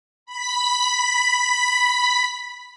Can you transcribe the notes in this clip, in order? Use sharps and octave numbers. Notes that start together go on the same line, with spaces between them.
B5 B6